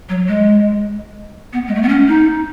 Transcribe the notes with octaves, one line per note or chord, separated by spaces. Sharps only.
F#3
G#3
B3
G#3
A3
B3
C#4
D#4